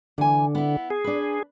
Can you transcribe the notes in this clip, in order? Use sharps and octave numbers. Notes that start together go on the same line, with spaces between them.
D3 E3 G#5
B3 E4
G#4
D4 B4